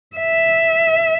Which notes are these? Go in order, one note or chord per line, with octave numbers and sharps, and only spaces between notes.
E5